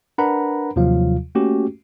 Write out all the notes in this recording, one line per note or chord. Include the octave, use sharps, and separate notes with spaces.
D4 A#4 B4 F#5 A#5 B5
D#2 C3 F3 F#3 F4 F5
A3 A#3 C#4 F#4 G4